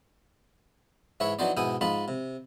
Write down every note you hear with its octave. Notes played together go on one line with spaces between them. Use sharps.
G#2 E3 E4 C#5 E5
E3 F#3 D4 D#4 C5 D5
G#2 B2 E4 G5 G#5 D#6
G#2 D#4 F4 A5 B5
C3